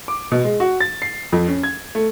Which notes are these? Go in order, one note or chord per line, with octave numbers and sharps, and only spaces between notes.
D6
B2
G#3
F#4
A6
C7
F2
C#4
G#6
A3